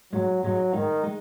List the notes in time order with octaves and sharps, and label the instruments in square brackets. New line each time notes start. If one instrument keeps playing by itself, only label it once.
[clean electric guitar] G#2 G#3 D#4 [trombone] F#3
[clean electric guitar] G#2 G#3 D#4 [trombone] F#3
[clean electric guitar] G#2 G#3 D#4 [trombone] D#3
[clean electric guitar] G#3 D#4